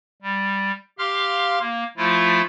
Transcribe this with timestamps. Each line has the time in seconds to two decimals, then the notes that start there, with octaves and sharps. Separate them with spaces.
0.22 G3
0.98 G4 F5 C6 F6
1.61 A#3
1.97 F3 A3 E4 F4